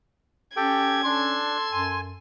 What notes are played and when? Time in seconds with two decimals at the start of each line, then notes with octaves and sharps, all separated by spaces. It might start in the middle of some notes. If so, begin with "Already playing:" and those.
0.56 C#4 G4 A4 G5 G#6
1.05 D4 A4 C6
1.72 F#2 G#5